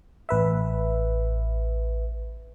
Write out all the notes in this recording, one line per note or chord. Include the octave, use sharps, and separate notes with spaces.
A1 B4 E5